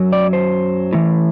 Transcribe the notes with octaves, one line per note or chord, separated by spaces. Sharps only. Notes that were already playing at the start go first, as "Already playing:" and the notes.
Already playing: F#2 F#3
D5
C5
A2 E3